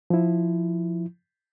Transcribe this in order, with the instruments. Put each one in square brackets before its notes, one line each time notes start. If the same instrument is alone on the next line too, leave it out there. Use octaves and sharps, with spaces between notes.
[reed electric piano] F3 E4